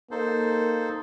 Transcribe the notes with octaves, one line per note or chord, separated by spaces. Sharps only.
A#3 D#4 A4 C5